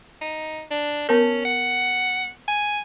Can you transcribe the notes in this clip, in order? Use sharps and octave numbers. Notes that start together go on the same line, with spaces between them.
D#4
D4
B3 C#4 A#4
F#5
G#5